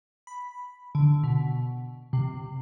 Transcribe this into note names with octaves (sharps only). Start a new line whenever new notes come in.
B5
D3
B2
C3